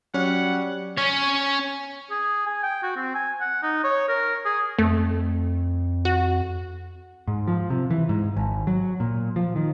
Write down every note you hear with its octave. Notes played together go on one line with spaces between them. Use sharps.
F#3 G3 C#4 F#5
C#4 C#5
G#4
G#5
G5
F#4
C4
G#5
F#5
D#4
C#5
A#4
G#4
F2 A3
F#4
G#2
F3
C3
E3
G#2
G#1
F#3
A#2
F3
D#3